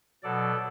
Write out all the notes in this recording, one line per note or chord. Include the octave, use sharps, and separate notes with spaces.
B2 F#3 A4 D5